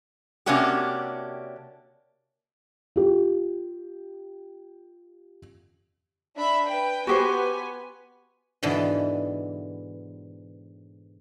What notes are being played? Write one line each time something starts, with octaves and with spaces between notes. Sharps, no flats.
C3 A#3 C#4 D4 F#4 G4
F4 G4
D4 E5 B5
B4 G5
B3 F#4 G4 B4 C5 G#5
G#2 B2 D3 E3